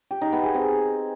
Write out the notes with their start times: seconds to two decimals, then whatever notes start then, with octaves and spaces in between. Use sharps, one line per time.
0.11 G4
0.22 D#4
0.33 B3
0.43 G#4
0.54 C4